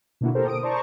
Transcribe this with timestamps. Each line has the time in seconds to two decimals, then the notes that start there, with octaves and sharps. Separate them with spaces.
0.21 B2 D3 A#3 E4 F#4
0.35 G4 A4 A#4 C5
0.47 D#6 D7
0.63 C5 D5 A5 A#5 C#6